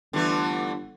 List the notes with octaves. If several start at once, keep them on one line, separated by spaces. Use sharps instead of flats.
G1 D3 E3 A3